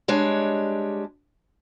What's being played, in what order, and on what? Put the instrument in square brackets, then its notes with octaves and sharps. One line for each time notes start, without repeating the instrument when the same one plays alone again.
[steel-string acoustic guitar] G3 G#3 D4 C#5